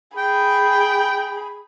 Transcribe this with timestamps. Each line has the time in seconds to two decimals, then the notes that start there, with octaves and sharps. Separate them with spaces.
0.18 G#4 G5 B5